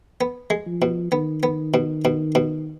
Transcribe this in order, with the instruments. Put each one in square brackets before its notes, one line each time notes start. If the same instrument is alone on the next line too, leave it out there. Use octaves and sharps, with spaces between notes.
[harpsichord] B3
G#3
[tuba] F3
[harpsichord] B2
[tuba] D#3 [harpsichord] B3
[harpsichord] B3
B2
B2
B2